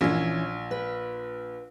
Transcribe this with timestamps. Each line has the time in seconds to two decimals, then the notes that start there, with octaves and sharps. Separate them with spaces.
0.01 A#1 E3 C#4
0.71 B4